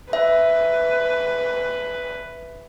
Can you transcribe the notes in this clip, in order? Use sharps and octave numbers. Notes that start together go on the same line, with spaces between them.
B4 E5